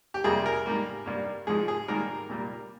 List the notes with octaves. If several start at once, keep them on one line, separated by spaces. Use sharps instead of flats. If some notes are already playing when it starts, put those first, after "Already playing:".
G4
F2 C3 G3 A#3 G#4
A#4
G#2 G3 A#3
G2 G3 A#3
G#2 F3 G#3 G#4
G#4
G#2 D#3 G3 A#3 A#4
A#2 G3 A#3